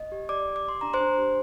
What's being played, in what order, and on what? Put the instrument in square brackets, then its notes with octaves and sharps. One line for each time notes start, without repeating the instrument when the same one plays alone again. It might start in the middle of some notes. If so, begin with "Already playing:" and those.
Already playing: [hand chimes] D#5
G4
G4 D5 D6
G4
D6
G4 C6
D4 A#5
C5 C6
D4
G4